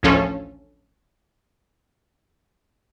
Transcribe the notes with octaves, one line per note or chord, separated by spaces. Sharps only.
A1 D2 F3 C#4 F4 A4